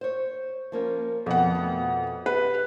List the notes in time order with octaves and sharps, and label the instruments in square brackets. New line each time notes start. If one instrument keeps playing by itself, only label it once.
[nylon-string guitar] C5 C#5
F3 A#3 C#4
[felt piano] F2 F#5 [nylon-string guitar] B2 D3
[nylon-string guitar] B2 A3
[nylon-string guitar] G4 [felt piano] B4